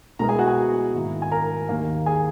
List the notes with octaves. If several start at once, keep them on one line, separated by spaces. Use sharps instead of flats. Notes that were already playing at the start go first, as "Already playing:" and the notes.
B2 G#3 B3 E4 A#4 A#5
G#4 G#5
F#4 F#5
G#4 G#5
G#2 D#3 A#3 E4
G#5
A#4 A#5
D#2 D#3 A#3
G#4 G#5